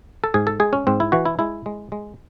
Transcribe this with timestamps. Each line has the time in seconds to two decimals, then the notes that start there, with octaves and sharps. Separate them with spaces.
0.24 A4
0.34 G#2 G#4
0.47 A4
0.60 G#3 G#4
0.73 C#4
0.87 G#2 C4
1.00 E4
1.12 E3 F#4
1.25 E4
1.39 G#3 E4
1.66 G#3
1.92 G#3